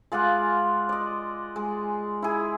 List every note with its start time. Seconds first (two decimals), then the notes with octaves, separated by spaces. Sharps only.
0.12 G#3 F4 D5 F#5
0.89 D5 D#5
1.56 G#3
2.22 E4 G#4